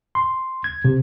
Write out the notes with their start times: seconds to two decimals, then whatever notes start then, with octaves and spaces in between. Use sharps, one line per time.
0.15 C6
0.64 G#6
0.85 C3